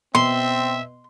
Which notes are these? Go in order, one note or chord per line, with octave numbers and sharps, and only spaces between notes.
B2 C4 E5 C6